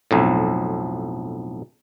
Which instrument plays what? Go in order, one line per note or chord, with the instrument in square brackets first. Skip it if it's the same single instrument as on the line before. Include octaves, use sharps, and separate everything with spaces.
[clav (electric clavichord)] B1 F2 A2